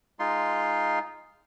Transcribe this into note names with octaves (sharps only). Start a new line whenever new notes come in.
G#3 D#4 F4 C6